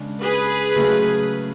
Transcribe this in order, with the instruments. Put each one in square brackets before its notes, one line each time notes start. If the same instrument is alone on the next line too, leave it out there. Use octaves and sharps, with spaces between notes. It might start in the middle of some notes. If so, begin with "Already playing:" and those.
Already playing: [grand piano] C#3 G#3 D4
[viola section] G#4 B4
[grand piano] C#3 F#3 A3